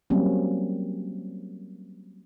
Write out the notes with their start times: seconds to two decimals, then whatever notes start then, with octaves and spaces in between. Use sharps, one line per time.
0.10 F#3 G3 A#3 C4 C#4